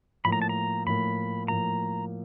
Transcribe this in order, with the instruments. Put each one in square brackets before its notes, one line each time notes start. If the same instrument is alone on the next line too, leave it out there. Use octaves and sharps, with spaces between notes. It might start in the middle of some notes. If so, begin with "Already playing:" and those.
[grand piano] A2 F3 A#3 [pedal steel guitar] B5
[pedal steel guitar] A#5
A5
A#5
[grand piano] A2 F3 A#3 [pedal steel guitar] B5
[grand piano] A2 F3 A#3 [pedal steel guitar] A#5